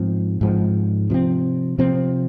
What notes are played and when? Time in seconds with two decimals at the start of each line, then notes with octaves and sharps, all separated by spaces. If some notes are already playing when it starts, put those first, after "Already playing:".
Already playing: G#2 F3 C4
0.41 G#2 F3 C4
1.10 C3 F3 C4
1.79 C3 F3 C4